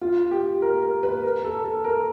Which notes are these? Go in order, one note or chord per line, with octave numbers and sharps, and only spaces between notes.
F4
G4
A#4
A#4
B4
A#4
A4
A4
A#4